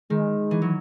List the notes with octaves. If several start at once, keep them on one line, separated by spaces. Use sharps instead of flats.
D#3 G#3
E3
F#3